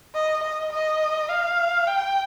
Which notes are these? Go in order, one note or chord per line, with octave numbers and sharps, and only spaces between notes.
D#5
D#5
D#5
F5
G5